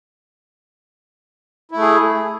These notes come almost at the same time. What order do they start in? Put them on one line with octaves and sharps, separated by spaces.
E4 A3 G#4